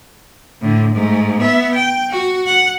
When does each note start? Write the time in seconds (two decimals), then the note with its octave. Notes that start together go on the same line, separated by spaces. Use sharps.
0.61 A2 D3
0.95 G#2 A3
1.39 B3 E5
1.75 G5
2.10 F#4
2.47 F#5